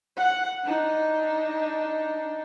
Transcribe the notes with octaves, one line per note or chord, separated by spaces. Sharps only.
F#5
D4 D#4